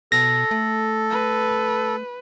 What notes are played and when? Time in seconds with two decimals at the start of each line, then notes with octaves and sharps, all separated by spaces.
0.12 B2 A4 A#6
0.51 A3
1.10 B4